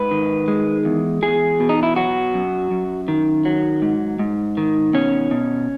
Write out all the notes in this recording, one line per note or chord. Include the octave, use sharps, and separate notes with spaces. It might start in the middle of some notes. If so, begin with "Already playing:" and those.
Already playing: G#2 B4
D#3
G#3
E2
E2 G#4
B2
D#4
E4
F#3 F#4
F#2
F#2
D#3
F#3
G#2
G#2
D#3
B2 C#4
B2